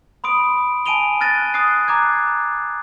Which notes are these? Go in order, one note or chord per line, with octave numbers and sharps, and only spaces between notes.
B5 C6 D#6 D7
G#5 A5 D7 D#7 F7 G7
F6 F#6 A6 A#6 D#7
D#6 F#6 A6 C7
A#5 D6 F#6 G#6